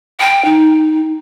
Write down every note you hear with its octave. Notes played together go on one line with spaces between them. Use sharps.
G5
D#4